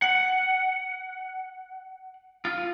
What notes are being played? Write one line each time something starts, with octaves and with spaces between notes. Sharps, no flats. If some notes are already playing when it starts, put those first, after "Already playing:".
F#5
F4